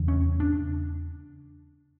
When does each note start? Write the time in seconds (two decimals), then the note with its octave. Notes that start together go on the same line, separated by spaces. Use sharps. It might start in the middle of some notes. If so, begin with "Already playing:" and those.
Already playing: E2 C#3
0.08 C#4
0.40 D4